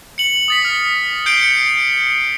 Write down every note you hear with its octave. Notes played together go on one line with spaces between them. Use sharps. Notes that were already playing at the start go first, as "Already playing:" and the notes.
C#7 F#7
D#6 A6 B6
F6 F#7
G6 C7 D7 G7
G6 C#7 D7